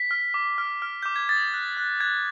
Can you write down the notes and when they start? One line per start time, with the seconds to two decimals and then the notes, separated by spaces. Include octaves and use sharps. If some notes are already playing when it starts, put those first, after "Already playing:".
Already playing: B6
0.11 F6
0.34 D6
0.58 F6
0.82 F6
1.03 D6 G6
1.16 G#6
1.29 D#6 A6
1.54 F#6
1.77 F#6
2.00 F#6 G#6